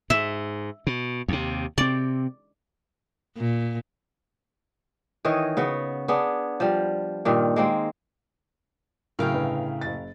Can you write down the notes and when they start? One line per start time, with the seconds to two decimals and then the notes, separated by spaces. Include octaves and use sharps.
0.10 G#2 E5
0.87 B2
1.28 D#2 C3
1.78 C3 C4 D5
3.37 A#2
5.25 D#3 E3 C#5 D#5
5.57 C#3 B3 F#4
6.08 B3 D4 G#4
6.60 F3 G3
7.25 G2 A#2 D#3
7.56 G#3 A#3 C4
9.19 A2 C#3 F#3 A#4 F5 G5
9.33 G1 B4
9.81 F#1 A6